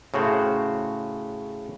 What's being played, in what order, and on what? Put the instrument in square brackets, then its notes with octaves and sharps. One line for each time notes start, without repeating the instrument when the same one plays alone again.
[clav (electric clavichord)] A2 C#3 F#4 C5